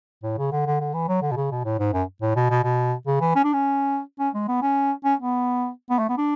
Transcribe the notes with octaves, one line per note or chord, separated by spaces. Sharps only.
A2
C#3
D3
D3
D3
E3
F#3
D3
B2
C#3
B2
A2
G#2
F#2
A2
B2
B2
B2
C#3
E3
C#4
D4
C#4
C#4
G#3
B3
C#4
C#4
B3
B3
A3
B3
D4